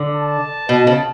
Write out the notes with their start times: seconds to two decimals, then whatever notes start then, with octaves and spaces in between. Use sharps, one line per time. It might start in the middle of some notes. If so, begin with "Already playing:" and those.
Already playing: D3
0.15 A5
0.69 B2
0.87 C#3